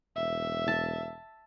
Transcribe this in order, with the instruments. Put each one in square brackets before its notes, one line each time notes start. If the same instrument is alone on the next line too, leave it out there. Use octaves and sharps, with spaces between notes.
[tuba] E1 [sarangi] E5
[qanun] A5